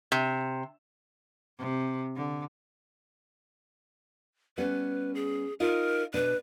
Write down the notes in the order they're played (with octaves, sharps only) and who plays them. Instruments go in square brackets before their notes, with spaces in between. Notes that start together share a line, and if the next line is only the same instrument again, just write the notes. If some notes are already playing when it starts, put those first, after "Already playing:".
[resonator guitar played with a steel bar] C3
[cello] C3
D3
[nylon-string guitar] G3 B3 C#4 [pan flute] B4
[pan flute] G#4
[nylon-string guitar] D#4 F4 D#5 [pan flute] A#4
[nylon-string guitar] B2 D4 [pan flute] B4